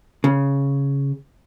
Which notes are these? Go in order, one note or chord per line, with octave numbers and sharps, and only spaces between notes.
C#3